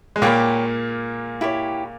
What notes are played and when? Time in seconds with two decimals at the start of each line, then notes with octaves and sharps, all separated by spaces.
0.16 G#3
0.22 A#2 A#3 G4 C#5 G5 B5
1.41 E4 G4 C#5